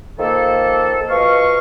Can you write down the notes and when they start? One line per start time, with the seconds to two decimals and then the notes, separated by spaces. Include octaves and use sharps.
0.19 D#3 F3 A#3 A4
1.09 B2 F3 D#5 F5 C#6